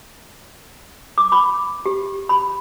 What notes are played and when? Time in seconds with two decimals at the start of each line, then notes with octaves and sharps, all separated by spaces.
1.18 D6
1.32 B5
1.86 G4
2.29 B5